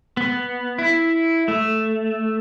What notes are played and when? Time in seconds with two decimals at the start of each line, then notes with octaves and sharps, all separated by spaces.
0.17 B3
0.78 E4
1.48 A3